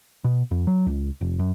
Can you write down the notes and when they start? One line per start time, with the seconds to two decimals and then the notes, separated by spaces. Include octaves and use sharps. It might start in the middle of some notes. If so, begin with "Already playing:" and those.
0.24 B2
0.51 F2
0.67 F#3
0.86 C#2
1.21 F1
1.39 F#2